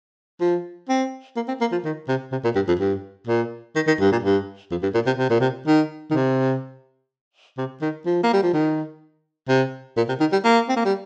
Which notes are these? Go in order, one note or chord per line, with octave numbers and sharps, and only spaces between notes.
F3
C4
A#3
C4
A#3
F3
D#3
C3
C3
A#2
G2
F2
G2
A#2
D#3
D#3
G2
A#2
G2
F2
G2
A#2
C3
C3
A#2
C3
D#3
D#3
C3
C3
D#3
F3
A#3
G3
F3
D#3
C3
A#2
C3
D#3
G3
A#3
C4
A#3
G3